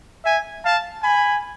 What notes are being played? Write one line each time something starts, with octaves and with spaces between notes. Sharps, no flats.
E5 G#5
F5 A5
G#5 B5